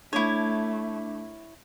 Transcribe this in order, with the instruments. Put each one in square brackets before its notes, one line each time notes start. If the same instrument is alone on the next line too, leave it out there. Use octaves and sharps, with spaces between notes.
[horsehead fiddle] A3 [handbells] D4 D6 [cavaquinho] E4 C#5